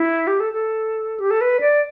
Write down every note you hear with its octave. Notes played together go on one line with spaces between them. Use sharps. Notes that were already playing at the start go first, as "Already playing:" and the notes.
Already playing: E4
G4
A4
A4
G4
A4
B4
D5